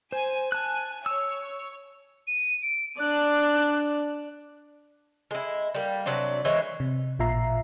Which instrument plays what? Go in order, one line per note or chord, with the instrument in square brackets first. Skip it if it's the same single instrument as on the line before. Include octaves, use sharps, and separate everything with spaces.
[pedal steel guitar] C5 [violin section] G#5
[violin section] G#5 [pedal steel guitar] A5 F#6
[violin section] C#5 [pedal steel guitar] E6
[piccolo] D#7
D7
[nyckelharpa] D4 D5 [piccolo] F#6
[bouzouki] G#3 E4
G3 A#3
C3 F#3 D4 D5
E3 G#3 C5 C#5
[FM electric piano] C3
A1 A#2 F4 E5 A#5 C7